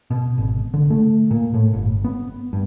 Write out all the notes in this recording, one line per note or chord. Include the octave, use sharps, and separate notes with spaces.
B2
G#1
D3
A3
A#2
A2
G1
B3
G2